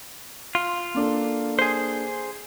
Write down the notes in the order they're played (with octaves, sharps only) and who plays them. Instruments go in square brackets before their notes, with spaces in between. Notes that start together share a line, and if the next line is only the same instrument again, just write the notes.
[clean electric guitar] F4
[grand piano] A#3 D4 A4
[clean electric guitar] G#4 C5